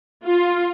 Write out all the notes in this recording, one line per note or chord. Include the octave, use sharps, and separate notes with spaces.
F4